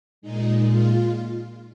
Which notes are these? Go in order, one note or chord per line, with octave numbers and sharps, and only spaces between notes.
A#2 G#3 D#4
F4